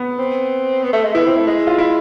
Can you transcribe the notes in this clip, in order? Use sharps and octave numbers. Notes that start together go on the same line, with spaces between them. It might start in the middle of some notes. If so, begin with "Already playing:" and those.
Already playing: B3
C4
B3
A3
G#3
B3 E4
C4
A3
G#3
F4
E4